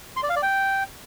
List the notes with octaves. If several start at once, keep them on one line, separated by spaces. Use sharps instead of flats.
C6
D5
F5
D5
G5